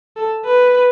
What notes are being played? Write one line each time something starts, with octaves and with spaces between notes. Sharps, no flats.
A4
B4